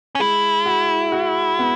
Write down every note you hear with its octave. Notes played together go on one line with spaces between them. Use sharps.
C#4
G#3 E4
F#4
F#4
B3